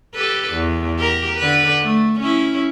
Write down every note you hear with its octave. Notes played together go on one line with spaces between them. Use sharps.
G4 A4 B4
E2
G4 A#4
D3 B4
A3
C#4 E4